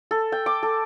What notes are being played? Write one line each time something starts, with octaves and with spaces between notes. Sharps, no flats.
A4
G5
D6
A4